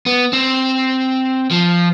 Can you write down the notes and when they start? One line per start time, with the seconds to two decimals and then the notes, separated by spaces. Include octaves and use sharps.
0.06 B3
0.33 C4
1.51 F3